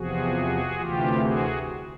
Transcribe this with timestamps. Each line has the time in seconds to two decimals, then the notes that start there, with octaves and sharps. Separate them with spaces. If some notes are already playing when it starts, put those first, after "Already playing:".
Already playing: E2 C3 F3 F#4 G#4
0.77 D2 C3 E3 F4 G4
1.19 F#4 G#4